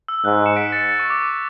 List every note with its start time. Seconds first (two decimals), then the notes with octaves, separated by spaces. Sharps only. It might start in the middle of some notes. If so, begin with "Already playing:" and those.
0.08 E6
0.25 G#2 F#6
0.35 F#6
0.46 C#7 E7
0.56 B6 D7
0.72 A6 C#7
0.99 C#6
1.10 D6